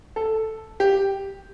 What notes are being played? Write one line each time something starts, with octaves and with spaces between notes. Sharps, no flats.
A4
G4